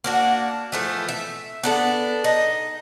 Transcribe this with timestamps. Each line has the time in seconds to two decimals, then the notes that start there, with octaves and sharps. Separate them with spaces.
0.04 A#3 D4 F#4
0.72 E3 F3 A3
1.08 E5
1.63 B3 D4 A4
2.24 D#4